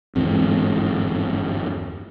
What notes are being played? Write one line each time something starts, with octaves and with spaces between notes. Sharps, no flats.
G1 E2 G#2 C4